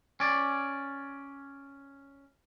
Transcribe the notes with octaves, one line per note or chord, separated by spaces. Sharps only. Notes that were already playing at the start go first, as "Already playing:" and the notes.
C#4 D5